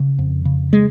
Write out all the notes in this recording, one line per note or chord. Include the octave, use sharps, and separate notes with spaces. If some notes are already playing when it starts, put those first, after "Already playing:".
Already playing: C#3
F2
C#3
G#3